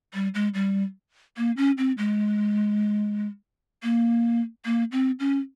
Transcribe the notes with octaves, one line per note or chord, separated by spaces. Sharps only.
G3
G#3
G3
A#3
C#4
C4
G#3
A#3
A#3
C4
C#4